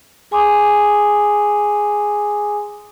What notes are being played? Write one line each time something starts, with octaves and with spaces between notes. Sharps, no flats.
G#4 G#5 C6 D6 D#6